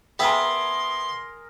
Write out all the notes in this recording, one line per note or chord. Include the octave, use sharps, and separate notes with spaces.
B3 G#4 A#4 E5 G5 C6